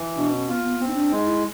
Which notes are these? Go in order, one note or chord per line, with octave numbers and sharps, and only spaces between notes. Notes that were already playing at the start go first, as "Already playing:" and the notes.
Already playing: E3
B2 D4
C#4
B3 F4
B3
B3 C4
D#4
D4
G#3 D#4
E4